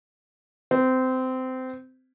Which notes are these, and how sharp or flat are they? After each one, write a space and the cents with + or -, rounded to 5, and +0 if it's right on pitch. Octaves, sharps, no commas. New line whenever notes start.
C4 -20